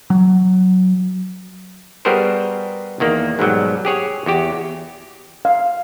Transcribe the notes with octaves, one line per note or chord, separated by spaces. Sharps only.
F#3
G3 B3 F#4 G#4 A#4 C5
E2 D#3 A#3
G#2 B2 F#3 G3
G4 G#4 C#5 F#5
E2 F#4 G4
F5